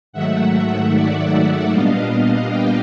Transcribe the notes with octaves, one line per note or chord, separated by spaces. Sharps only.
G#2 D#3 F#3 A3 E5 F#5
D5 E5
A#2 G3 B3 D4 D#5 F5
F5 G5